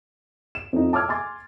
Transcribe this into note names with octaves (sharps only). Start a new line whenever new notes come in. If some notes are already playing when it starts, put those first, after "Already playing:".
E7
F2 D#4
A5 D6 E6 F6 G#6
G#5 C6 D6 A6